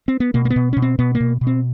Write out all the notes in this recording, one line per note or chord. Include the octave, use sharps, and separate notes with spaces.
C4
B3
B2 A#3
A#3
B3
B2
B2 C#4
C4
B2 B3
A#3
B2
B2
C4